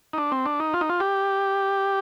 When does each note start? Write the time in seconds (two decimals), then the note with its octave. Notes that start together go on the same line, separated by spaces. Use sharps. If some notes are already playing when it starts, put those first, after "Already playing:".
0.13 D#4
0.18 D4
0.32 C4
0.46 D4
0.60 D#4
0.74 F4
0.81 D#4
0.89 F4
1.00 G4